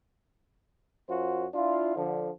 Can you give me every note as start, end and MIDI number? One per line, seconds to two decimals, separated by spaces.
1.07 1.45 42
1.07 1.45 65
1.07 1.45 66
1.07 1.45 72
1.54 1.95 62
1.54 1.95 64
1.54 1.95 65
1.96 2.28 50
1.96 2.28 53